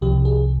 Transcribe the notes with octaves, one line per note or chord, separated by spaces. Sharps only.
C2 C3 F3 G4
G#4